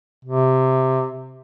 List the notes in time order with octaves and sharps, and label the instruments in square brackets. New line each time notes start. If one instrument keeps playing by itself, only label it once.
[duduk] C3